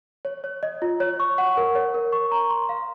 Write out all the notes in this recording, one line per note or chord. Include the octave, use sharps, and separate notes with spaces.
C#5
C#5
D#5
F4
C#5
C#6
F#5
A#4
C#5
A#4
C#6
A#5
C6
F5